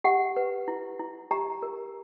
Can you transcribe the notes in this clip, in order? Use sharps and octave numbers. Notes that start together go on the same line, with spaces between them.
G4 F#5
B4
E4
E4
G4 A#5
A#4